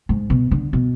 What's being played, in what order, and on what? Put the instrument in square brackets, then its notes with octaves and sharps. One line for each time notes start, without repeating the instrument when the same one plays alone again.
[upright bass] G#2
B2
D3
B2